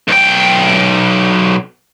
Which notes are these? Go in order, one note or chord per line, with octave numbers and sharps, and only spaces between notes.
B1 G5